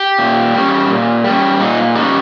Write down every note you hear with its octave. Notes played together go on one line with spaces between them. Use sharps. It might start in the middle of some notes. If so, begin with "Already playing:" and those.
Already playing: G4
A#2
G3 C#4
A#2
G3 C#4
A#2 D#4
G3 C#4 D#4